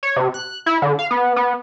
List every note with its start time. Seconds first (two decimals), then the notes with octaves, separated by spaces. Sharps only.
0.03 C#5
0.16 C3
0.34 F#6
0.66 E4
0.82 D3
0.99 F5
1.11 B3
1.36 B3